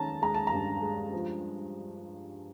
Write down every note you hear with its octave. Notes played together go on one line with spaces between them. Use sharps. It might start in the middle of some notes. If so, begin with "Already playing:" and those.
Already playing: D#3 G#3 C#4 A5 A#5
G#3 A#5
A5
G2 A#5
G#3
F3